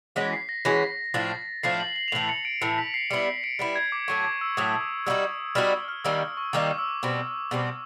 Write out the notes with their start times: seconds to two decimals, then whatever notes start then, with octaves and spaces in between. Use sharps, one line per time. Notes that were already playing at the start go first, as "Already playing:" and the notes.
0.16 E3 G#3 C#4 F#4 B6
0.33 C7
0.49 A#6
0.65 E3 G#3 C#4 F#4 A#6
1.14 A2 F3 A3 D4 A6
1.63 A2 F3 A3 D4 C7
1.80 F#7
1.96 F#7
2.08 F7
2.12 A2 E3 A3 F#7
2.29 C#7
2.45 D7
2.62 A2 E3 A3 C#7
2.78 B6
2.94 C7
3.10 G3 B3 E4 C#7
3.44 D7
3.59 G3 B3 E4 C#7
3.76 G#6
3.92 D6
4.08 A2 F#3 A3 C#6
4.25 D6
4.41 E6
4.57 A2 F#3 A3 D#6
5.06 G3 B3 D#4 F#4 E6
5.55 G3 B3 D#4 F#4 F6
5.72 E6
5.88 F6
6.04 D#3 G3 A#3 D#4 E6
6.37 C#6
6.53 D#3 G3 A#3 D#4 D6
6.78 E6
7.03 B2 G3 C4
7.51 B2 G3 C4